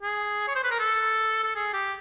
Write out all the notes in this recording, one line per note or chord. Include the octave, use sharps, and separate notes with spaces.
G#4
C#5
C5
B4
A#4
A4
A4
G#4
G4